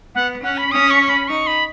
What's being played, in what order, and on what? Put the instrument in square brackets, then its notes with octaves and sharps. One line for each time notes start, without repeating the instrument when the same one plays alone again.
[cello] B3 [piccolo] F#5
[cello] C#4 [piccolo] F#5
[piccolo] B5
[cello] C#4 [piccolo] D#6
[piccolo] C#6
B5
[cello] D#4 [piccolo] C#6
[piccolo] B5